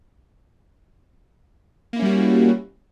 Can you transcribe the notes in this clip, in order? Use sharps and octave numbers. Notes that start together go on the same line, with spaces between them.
G3 A#3 C#4 E4 F#4